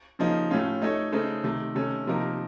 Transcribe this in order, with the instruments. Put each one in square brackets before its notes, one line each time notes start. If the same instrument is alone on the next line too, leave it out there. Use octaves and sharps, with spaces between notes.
[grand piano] C#3 F3 A#3 D#4
A2 A3 C#4 F4
A3 D#4 A4 C#5
C#3 A3 D#4 A4 C5
C3 D#3 A3
C3 D#3 A3 C#4 A4
C3 F3 A#3 D#4 A#4